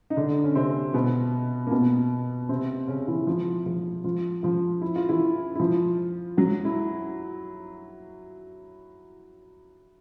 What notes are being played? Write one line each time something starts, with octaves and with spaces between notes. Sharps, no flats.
D#4
D3 D4
C#4
C3 C4
B2 B3
A#3
B2 B3
C3 C4
C#3 C#4
E3 E4
F3 F4
F3 F4
F3 F4
F3 F4
E4
F4
E3 E4
E4
F3 F4
F#3 F#4
E4